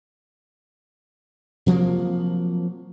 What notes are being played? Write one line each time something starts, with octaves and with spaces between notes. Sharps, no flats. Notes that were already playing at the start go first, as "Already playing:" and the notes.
C3 F3 F#3 A#3